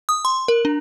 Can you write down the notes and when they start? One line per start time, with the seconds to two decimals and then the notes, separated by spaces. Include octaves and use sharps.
0.09 D#6
0.25 C6
0.48 A#4
0.65 D4